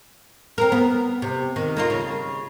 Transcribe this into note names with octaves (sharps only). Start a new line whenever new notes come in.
C4 A#4
B3
C3
D#3
A#3 D#4 F4
C#3